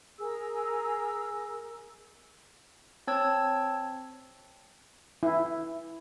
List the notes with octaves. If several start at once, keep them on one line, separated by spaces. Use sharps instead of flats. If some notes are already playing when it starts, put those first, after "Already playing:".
G#4 A#4 E6
C4 C#5 A5 E6 G#6
E4